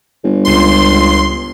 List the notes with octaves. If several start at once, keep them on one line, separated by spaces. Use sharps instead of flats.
G1
C#2 C6